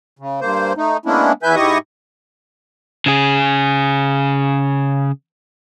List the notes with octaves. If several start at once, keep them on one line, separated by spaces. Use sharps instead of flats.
C#3
G2 A#3 C5
A3 D#4
G#3 A#3 B3 C#4 D4 E4
E2 E3 B4 E5 G#5 G6
G#2 E4 G4 D#5 C#6 D#6
C#3 G#4